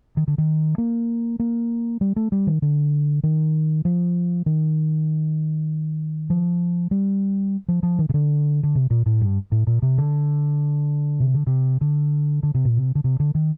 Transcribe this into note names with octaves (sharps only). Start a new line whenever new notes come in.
D#3
D3
D#3
A#3
A#3
G3
A3
G3
D#3
D3
D#3
F3
D#3
F3
G3
F3
F3
D#3
C3
D3
D3
C3
A#2
A2
G2
A2
A#2
C3
D3
C3
D3
C3
D3
D3
C3
A#2
C3
D3
C3
D3
D#3